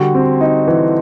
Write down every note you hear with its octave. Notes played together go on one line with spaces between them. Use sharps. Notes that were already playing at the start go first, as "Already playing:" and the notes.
Already playing: D3 G3 F#4
C4
D#4
E3